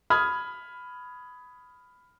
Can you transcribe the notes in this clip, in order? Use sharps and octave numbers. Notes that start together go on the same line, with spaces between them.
B5 D#6 F6 G#6